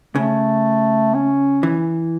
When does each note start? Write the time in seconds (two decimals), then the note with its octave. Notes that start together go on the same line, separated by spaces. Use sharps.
0.15 C#3 A3
1.14 C#4
1.63 E3